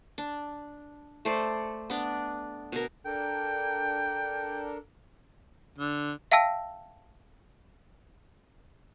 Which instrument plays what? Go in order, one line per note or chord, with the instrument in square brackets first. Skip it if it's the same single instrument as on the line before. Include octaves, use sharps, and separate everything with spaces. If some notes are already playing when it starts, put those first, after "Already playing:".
[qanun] D4
A3 C5 D5
B3 D4 D5
B2 A#4
[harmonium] D4 A4 A#4 [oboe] G5
[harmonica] D3
[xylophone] E5 F5 G5 A5 E6 A#6